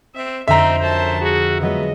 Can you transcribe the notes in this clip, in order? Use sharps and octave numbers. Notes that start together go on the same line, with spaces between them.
C4 E5
F2 D3 C4 D#4 E5 A#5 C6 G6
F#2 C5 A5 G6
F#4 G#4
F3 F#3 G#3 B3 D#5